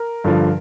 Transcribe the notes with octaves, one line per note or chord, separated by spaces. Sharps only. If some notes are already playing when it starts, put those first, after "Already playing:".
Already playing: A#4
G2 D3 F3